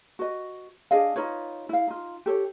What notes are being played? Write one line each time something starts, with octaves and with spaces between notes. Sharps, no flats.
F#4 B4 D#5
D4 G#4 D#5 F5
D#4 F4 B4 C#5
E4 F5
D#4 F4
G4 A4 C#5